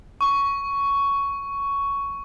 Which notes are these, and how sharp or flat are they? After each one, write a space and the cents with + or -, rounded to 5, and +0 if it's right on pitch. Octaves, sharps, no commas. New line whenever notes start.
C#6 +10